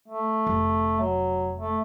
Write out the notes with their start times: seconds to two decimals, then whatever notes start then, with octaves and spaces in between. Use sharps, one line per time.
0.08 A3
0.46 F1
1.00 F#3
1.58 A3